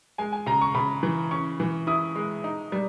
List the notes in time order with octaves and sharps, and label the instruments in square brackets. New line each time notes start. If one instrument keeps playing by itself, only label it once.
[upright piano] G#3 [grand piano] G#5
[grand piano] G#5
[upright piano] C#3 [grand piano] A#5
[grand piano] C#6
[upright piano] C#3 [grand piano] B5
[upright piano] E3
[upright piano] C#4 [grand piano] C#6
[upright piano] E3
[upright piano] E4 [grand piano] D#6
[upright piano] G#3
D#4
G3